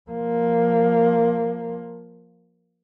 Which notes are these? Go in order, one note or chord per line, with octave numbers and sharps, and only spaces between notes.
F3 A#3